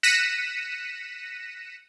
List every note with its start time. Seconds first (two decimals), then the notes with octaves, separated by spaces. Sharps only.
0.03 F#6 A#6 B6 C#7 D#7 E7